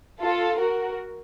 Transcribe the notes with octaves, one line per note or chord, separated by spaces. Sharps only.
F4 A4
F#4 A#4